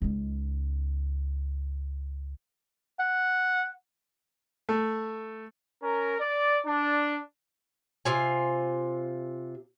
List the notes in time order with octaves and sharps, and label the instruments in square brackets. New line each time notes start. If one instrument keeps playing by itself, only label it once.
[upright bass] C#2 D#4
[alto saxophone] F#5
[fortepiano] A3
[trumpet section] C#4 A#4
D5
D4
[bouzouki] C3 F4 G#5